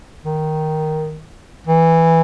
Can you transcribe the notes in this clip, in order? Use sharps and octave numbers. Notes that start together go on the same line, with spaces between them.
D#3
E3